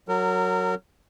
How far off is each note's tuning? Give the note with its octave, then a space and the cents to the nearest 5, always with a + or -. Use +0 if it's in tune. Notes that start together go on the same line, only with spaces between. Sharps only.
F#3 +0 A#4 -30